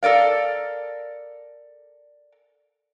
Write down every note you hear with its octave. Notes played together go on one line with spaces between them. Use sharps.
A4 A#4 D5 F5